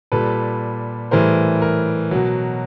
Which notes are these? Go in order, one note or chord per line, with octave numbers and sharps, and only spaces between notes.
A#2 G3 A4 B4
A2 E3 G3 A#4 C5
A#4
B2 F#3